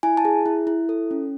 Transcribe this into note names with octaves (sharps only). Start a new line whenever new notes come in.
E4 G#5
A5
G#4
E4
E4
A4
C#4